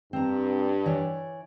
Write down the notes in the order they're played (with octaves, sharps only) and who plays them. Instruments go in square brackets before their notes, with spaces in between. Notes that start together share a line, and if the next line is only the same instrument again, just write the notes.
[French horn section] G2 [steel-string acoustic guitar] C4 A#5
[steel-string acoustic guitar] E3 C#5 D5